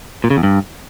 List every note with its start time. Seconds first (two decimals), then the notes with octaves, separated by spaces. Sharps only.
0.24 A#2
0.30 C#3
0.37 E2
0.43 G2